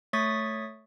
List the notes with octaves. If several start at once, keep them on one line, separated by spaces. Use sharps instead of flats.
A3 C#5 C#6 D#6 A6 B6